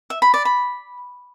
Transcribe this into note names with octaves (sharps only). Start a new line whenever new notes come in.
E5
B5
D5
B5